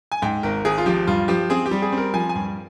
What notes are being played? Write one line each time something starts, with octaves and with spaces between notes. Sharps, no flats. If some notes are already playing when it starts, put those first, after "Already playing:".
G#5
G#2 G5
G#1 A#4
G#1 G#4
F4
F3 G4
G2 F4
F3 G4
C4 G#4
G4
G3
G#4
C4
A#4
F3 G#5
G#5
G2